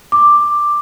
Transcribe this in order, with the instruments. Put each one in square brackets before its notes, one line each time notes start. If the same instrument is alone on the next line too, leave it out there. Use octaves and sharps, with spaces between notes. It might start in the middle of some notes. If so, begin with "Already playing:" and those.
[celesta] D6